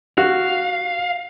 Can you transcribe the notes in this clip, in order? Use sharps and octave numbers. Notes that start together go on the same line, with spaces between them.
F#4 F5